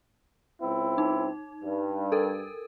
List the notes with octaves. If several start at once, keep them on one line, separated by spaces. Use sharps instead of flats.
C#2 C4 E4
D#4
G2
A4 A#4